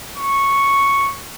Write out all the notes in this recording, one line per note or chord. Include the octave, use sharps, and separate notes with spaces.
C#6